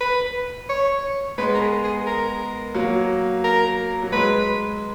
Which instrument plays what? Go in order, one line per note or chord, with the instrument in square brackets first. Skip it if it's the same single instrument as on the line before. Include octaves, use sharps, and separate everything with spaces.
[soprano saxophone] B4
C#5
[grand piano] G#3 B3 [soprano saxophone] B4
[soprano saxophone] A#4
G#4
G#4
A#4
[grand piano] F#3 A#3
[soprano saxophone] A#4
[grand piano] F#3
[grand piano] G#3 [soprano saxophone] B4